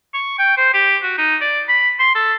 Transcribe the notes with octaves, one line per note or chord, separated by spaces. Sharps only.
C#6
G5
C5
G4
F#4
D#4
D5
B5
C6
A4